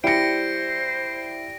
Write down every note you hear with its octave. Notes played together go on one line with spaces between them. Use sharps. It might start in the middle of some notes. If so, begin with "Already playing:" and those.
G3 E4 C5 A#6 C#7 D7